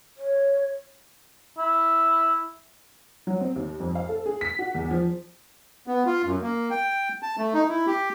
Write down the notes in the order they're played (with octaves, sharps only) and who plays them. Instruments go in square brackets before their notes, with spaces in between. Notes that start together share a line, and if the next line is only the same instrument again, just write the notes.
[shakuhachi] C#5
[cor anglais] E4
[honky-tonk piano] F#3
C4
D#2
F2
F5
A4
G#4
B6
F#4
E2
F3
[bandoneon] B3
F4
F#2
A#3
G5
A5
A3
D#4
E4
G4